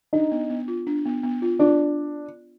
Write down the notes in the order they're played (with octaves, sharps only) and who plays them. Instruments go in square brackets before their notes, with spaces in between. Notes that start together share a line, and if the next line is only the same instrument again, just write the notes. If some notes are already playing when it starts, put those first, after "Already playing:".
[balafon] D4 [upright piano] D#4
[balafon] B3
B3
F4
D4
B3
B3
F4
[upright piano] D4 [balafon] F4